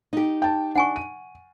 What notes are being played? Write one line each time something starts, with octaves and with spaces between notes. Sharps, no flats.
D#4 G4
G5 A5
D4 F#5 G#5 C#6
D#7